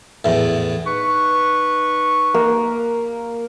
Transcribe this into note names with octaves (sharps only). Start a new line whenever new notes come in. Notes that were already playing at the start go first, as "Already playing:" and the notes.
E2 A2
D#4 B4 C#6
A#3